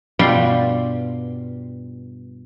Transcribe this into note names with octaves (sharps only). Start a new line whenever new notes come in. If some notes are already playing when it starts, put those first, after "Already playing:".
G2 B2 G3 F4 D5 C6